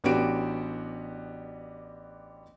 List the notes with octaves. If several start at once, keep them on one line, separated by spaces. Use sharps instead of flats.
A1 B3 D4 F#4 G4 D7